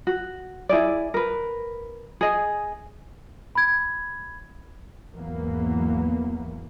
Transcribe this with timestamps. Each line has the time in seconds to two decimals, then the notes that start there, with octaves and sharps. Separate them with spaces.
0.07 F#4
0.69 E4 G#4 D5
1.14 A#4 B4
2.21 G#4 D#5
3.55 B5 G#6
5.15 G#1 E2 E3 F#3 A#3 B3